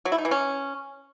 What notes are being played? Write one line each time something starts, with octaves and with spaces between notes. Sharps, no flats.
F#3
E4
D#4
E3
C#4